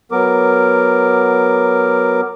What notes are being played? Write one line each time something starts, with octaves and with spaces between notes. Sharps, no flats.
F#3 B3 A#4 D6